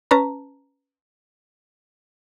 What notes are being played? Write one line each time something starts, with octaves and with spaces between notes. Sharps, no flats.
C#4 B4 A5 A#5